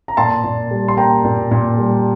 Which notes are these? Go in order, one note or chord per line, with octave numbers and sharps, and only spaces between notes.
A#5
A#2 A5 C6
A#2
G3
C6
A#3 G5 A#5
A#2
A#2
G3